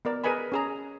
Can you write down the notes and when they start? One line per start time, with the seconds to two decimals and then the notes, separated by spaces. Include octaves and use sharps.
0.05 B3 A#4 D5
0.24 G#4 A#4 B4 D#5 G#5 B5
0.52 C#4 G#4 A#5